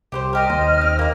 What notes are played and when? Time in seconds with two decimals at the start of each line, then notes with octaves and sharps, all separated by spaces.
0.12 C2 G4 B4 C5
0.33 D#4 G4 A#4 D#5 F6
0.50 D#2 C5
0.81 C4
0.99 A#3 A#4